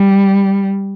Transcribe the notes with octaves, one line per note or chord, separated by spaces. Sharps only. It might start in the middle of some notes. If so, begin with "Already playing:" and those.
Already playing: G3